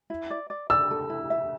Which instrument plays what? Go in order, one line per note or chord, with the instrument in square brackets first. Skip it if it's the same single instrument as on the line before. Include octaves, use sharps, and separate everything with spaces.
[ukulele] E4
D5
D5
[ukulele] D5 [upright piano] E6
[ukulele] A4
E4
E5